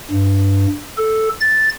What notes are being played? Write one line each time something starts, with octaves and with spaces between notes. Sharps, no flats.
G2
A4
A6